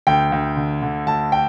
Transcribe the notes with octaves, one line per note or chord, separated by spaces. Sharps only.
D2 G5
D2
D3
D3
D2 A5
G5